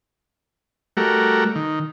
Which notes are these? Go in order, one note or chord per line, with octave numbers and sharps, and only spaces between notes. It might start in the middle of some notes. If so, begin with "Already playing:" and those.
G3 A3 F#4 A#4
D#3